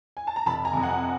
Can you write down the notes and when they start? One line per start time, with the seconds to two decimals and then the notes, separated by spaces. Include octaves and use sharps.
0.17 G#5
0.27 A5
0.36 A#5
0.46 F1 A5 B5
0.65 G#5 A#5
0.73 F2 C3
0.83 F#5 G#5